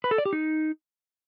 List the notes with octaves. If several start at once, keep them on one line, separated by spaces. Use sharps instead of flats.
B4
A4
D5
G4
D#4